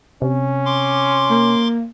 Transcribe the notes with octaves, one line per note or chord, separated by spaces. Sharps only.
C3 C#4
C6 D6
A#3